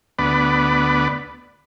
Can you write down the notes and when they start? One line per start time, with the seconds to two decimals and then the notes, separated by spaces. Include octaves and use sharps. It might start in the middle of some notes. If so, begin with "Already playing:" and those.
0.19 D2 B3 B4 D5